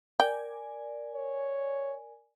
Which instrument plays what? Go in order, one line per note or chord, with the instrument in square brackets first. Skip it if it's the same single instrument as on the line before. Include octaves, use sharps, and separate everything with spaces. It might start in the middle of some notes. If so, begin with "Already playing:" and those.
[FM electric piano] A#4 D5 G#5 [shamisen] G5
[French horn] C#5